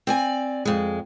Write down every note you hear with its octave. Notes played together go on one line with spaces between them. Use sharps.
C4 D5 G#5
F2 G#3